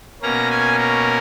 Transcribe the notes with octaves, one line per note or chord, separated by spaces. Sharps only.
B2 A#3 C#4 A#5
G#5
A#4